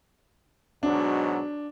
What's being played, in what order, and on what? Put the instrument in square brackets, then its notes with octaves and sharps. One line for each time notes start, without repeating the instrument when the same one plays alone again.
[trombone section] G#2 B2 F#3 [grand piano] D4